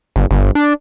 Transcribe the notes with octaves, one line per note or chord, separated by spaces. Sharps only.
G1
G1
D4